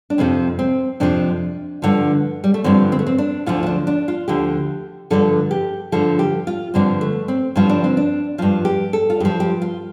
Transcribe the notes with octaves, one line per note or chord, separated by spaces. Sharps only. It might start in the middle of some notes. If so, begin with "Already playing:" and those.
D4
F2 C3 F3 C4
C4
F2 C3 F3 D4
G2 D3 F3
G3
A3
G2 D3 F3 C4
C4
A3
C4
D4
D2 D3 F3 F4
F4
D4
D4
F4
D2 D3 F3 G4
G2 D3 F3 A4
G4
G2 D3 F3 A4
G4
F4
G2 D3 F3 C4
A3
C4
G2 D3 F3 F4
D4
C4
D4
G2 F3 F4
G4
A4
F4
G2 F3 G4
G4
F4